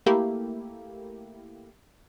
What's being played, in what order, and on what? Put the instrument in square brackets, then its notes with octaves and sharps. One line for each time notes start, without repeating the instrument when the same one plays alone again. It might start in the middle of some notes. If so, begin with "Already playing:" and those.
[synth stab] A3 A#3 E4 G4